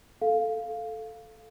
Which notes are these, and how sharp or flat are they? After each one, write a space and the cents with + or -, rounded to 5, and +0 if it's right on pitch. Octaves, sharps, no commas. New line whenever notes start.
A4 +0 F5 +0